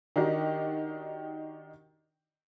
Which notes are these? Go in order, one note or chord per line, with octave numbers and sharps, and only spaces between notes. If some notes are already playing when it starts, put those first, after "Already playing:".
D#3 D4 D#4 F#4 G4